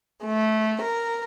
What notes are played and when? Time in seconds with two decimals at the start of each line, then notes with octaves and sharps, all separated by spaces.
0.23 A3
0.81 A#4